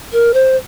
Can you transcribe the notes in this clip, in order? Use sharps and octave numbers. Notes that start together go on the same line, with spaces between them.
A#4
C5